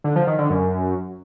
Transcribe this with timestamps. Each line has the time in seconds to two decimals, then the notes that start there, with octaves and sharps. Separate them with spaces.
0.04 D3
0.16 F3
0.27 D#3
0.38 D3
0.50 F#2